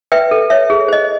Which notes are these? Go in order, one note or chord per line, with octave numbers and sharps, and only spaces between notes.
B4 E5 G5
A4
C#5 E5
G#4
C5 D#5